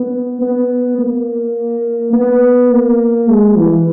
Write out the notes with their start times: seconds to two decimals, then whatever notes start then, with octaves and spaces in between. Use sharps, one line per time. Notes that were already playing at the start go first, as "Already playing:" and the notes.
Already playing: B3
0.41 B3
0.99 A#3
2.13 B3
2.71 A#3
3.28 G#3
3.57 E3